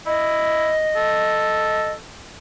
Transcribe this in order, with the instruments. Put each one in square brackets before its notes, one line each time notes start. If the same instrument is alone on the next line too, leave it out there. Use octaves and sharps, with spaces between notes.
[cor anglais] E4 [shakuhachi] D#5
[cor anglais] A4